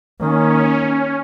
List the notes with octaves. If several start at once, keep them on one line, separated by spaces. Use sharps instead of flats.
D#3 A#3 C#4